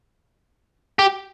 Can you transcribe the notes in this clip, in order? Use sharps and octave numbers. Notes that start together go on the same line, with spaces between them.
G4